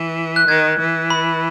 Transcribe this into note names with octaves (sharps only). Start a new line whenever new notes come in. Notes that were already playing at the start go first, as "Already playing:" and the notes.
Already playing: E3
F#6
D#3 G#6
E3
B5